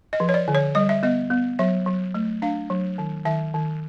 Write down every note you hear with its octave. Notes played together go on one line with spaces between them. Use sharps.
D#5
F3
C#5
D5
D3
C#5
G3 D#5
E5
B3 D#5
B3
F#3 E5
F#3
A3
D4 F5
F#3
D#3
D#3 E5
D#3